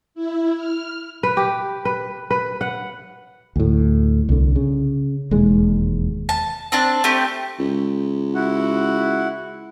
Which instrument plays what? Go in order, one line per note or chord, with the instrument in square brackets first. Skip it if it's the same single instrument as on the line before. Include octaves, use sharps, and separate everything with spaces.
[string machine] E4
F6
[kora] B4
G4
B4
B4
F#5
[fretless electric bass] D2 A2
C2 D3
C#3
E1 D#2 G#3
[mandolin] A5
C4 D4 A5
A3 C4 G4
[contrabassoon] C#2
[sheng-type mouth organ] E4 F#4 F#5